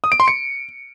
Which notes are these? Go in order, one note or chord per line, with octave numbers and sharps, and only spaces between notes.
D#6
D7
C6
C#7